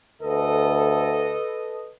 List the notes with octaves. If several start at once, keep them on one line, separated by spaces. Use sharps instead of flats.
D2 A4 B4 D#5